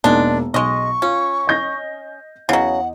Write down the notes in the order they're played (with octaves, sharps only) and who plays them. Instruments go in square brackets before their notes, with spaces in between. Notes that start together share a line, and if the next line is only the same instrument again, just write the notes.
[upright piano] E1 A#3 D#4 [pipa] G#3 D4
[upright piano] B1 [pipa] G#3 D#5 [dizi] C#6
[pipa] C#4 [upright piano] F4
[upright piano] D#5 G6 A#6
[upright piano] E2 D#5 [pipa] C#3 F#3 [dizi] F#5